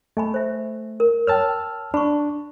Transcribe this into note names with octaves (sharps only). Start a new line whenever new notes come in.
A3 D#5 G#5 B5
C5 E5
A#4
C#5 G5 A5 E6 F6
D4 B5 C#6